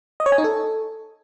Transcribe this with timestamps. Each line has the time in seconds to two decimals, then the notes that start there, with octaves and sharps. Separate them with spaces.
0.20 D#5
0.26 C#5
0.32 G#5
0.38 D#4
0.44 A4